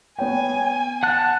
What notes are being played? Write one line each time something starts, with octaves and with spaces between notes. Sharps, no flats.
B3 C#5 G5 G#5
F#5 A5 F#6